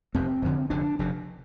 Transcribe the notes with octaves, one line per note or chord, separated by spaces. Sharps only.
F1 F2 C3 C4
F1 F2 D3
F1 F2 D3 D4
F1 F2 C3